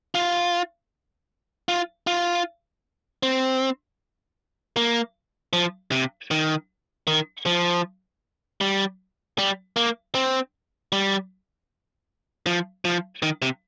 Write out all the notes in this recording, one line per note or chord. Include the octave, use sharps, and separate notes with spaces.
F4
F4
F4
C4
A#3
F3
C3
D#3
D#3
F3
G3
G3
A#3
C4
G3
F3
F3
D#3
C3